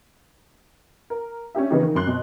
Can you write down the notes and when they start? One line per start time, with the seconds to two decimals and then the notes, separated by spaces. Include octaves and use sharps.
1.10 A#4
1.55 C#4 D4 G4 E5
1.70 C#3 E3 B3 C#4 D#4 G4
1.83 D#3
1.95 F#2 C6 F#6
2.07 B2